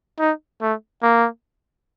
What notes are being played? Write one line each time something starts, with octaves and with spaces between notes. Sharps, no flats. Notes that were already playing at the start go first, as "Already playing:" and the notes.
D#4
A3
A#3